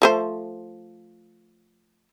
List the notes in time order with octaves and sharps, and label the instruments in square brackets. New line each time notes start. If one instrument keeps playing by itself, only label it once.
[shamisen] F3 A3 C5